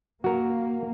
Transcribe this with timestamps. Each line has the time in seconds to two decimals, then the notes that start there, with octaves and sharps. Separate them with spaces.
0.24 A#3 F#4 A#4